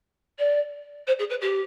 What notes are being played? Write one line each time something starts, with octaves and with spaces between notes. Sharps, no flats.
D5
C5
G#4
B4
G4